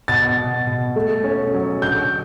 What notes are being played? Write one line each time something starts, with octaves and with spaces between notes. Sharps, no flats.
B2 A6
B2
B2
A3
C#4
F#3
D3 G6